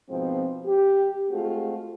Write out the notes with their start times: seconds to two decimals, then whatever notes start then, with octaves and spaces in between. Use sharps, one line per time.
0.10 G#2 B2 F3 C4
0.65 G4
1.30 G#3 A3 C4 F4 F#4 G#4